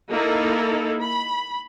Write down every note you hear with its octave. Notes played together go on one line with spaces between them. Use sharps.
A#3 D#4 E4 A4
B5